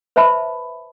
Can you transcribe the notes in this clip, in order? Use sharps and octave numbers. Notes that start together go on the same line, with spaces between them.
B4 C5 E5 A5 B5